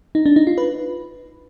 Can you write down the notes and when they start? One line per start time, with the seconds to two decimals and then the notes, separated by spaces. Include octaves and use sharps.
0.15 D#4
0.26 D4
0.36 D#4
0.47 F4
0.58 B4